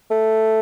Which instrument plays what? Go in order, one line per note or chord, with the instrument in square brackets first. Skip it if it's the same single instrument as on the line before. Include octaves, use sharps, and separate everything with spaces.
[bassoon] A3